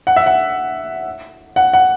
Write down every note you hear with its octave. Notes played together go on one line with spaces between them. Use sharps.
F#5
E5
F#5
F#5
F#5